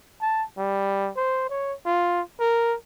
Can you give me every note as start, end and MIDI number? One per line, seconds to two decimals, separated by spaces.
0.21 0.44 81
0.57 1.10 55
1.16 1.45 72
1.50 1.74 73
1.85 2.21 65
2.40 2.76 70